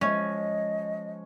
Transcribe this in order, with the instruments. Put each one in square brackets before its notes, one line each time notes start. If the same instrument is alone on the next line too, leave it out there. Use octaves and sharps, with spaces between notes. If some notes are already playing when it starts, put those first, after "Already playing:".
[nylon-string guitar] F3 G#3 E5 [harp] C#4 [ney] D#5